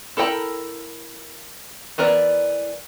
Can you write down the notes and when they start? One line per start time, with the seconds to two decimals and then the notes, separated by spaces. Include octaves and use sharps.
0.17 E4 A4 A#4 G5 B5
1.98 E3 B3 A#4 D5